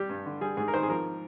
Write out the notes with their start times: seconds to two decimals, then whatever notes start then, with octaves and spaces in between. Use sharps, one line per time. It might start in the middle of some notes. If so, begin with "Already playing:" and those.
Already playing: G3 G4
0.09 G2
0.26 D3
0.41 G3 G#4
0.57 G#2 G#4
0.68 A#4
0.74 D#3 C5
0.83 G#4
0.89 F3 A#4